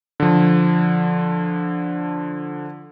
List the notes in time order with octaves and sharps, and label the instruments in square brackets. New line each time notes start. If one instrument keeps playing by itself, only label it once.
[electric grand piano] D3 F3